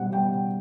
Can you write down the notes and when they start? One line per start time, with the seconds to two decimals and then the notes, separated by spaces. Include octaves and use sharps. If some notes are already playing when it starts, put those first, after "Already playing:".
Already playing: B2 G3 F#5
0.12 G3 G5